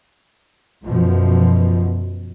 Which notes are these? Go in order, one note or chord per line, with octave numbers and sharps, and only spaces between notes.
F#2 B2 F3